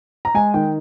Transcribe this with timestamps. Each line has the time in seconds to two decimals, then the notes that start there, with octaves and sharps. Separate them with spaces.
0.25 A#5
0.34 G#3 G#5
0.54 D#3 G5